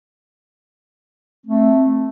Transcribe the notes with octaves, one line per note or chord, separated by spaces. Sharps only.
A3 C4